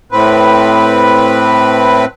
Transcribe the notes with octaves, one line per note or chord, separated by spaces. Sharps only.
A2 C4 B4